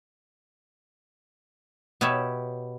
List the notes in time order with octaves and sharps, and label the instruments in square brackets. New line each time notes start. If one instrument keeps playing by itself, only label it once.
[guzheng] B2 B3 G4 C#5 E5